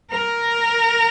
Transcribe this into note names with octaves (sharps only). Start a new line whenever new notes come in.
A#4